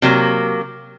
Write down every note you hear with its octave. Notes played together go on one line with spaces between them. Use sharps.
C3 F#3 A#3